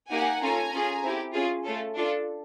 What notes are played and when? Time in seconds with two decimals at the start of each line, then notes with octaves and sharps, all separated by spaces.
0.11 A#3 D#4 G4 F#5 G#5
0.42 C#4 F4 A4 G#5 A#5
0.73 C#4 F4 G#4
1.04 C4 E4 G4
1.34 C#4 F4 G#4
1.65 A3 C#4 F4 A4
1.96 D4 F4 A4